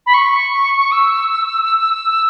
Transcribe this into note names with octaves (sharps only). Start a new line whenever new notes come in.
B5
C#6
E6